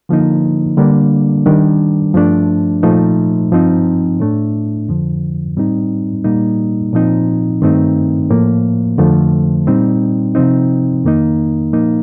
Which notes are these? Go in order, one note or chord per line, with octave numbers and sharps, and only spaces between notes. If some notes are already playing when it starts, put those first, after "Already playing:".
D3 F3 A#3 D#4
D3 G3 A#3 D4
D#3 G3 D4
G2 F3 A3 D4
A#2 F3 A3 D#4
G2 F3 C4 D#4
A2 A3 D4
F2 D3 F3
A2 G3 C4 D#4
A#2 G3 A#3 D#4
A#2 F3 C4 D#4
G2 D#3 A3 C4 D#4
A2 F3 A#3
F2 D3 F3 A3
A#2 G3 C4 D#4
C3 F3 C4 D#4
F2 D#3 A#3 D#4
A#2 F3 A#3 D#4